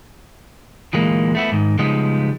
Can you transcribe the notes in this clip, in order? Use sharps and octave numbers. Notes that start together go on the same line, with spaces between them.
D2 A#2 E3 G3 G#3 A#3
A3 B3 E4
G#2 D#3
C#3 F3 G3 G#3 B3 D#4